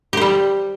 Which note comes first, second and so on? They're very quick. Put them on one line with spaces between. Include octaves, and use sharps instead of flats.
G4 C5 G3